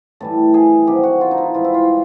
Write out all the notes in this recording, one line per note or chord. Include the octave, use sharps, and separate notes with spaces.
A2 E3 G3 A4
G#4
C3 D#3 F#3 G4
F#4
F4
D#4
E4
G#2 E3 G3 F4
E4
F4